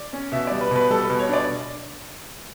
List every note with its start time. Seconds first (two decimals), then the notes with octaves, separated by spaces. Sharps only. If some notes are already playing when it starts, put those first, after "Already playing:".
Already playing: D5
0.13 C#4
0.32 B2 E5
0.47 G3 D5
0.61 B4
0.71 B2 B4
0.90 G3 A4
1.04 B4
1.10 B2
1.19 C#5
1.29 D4 D5